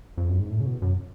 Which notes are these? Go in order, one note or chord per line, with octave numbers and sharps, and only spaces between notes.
F2
F#2
G#2
A2
C#3
B2
F#2